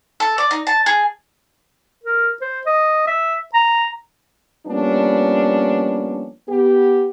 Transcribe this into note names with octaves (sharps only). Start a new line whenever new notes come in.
A4
D5
D#4
A5
G#4
A#4
C5
D#5
E5
A#5
F3 G3 A#3 B3 C#4 D4
B3 G4